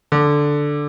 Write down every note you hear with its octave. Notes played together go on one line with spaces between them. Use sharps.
D3